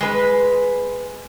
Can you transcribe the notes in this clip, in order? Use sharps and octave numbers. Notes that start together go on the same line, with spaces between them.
G#3 B4